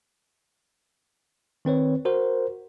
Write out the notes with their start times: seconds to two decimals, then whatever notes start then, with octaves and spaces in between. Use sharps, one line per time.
1.65 D#3 C4 B4 C#5
2.05 F#4 A#4 C5